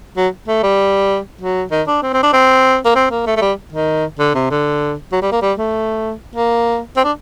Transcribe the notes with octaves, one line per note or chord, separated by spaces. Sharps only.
F#3
A3
G3
F#3
D#3
D4
C4
C4
D4
C4
A#3
C4
A#3
A3
A3
G3
D#3
D3
C3
D3
F#3
G3
A#3
G3
A3
A#3
C4
D4